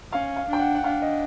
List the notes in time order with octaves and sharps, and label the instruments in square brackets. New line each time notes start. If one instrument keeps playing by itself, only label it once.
[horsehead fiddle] C#4 [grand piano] F5
[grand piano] F5
[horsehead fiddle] D4 [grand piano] G5
[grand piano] F#5
F#5
[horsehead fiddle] D4 [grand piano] F5
[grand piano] D#5